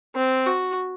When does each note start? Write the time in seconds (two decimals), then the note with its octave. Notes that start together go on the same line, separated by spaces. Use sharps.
0.15 C4
0.46 F#4